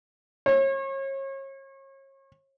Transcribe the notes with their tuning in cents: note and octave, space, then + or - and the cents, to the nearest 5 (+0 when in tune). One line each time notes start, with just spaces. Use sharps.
C#5 -35